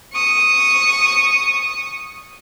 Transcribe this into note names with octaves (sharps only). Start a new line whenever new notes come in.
C#6 D#6